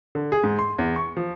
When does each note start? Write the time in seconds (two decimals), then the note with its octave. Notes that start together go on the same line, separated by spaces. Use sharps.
0.15 D3
0.32 G#4
0.44 G#2
0.59 C6
0.79 E2
0.96 C#6
1.17 F3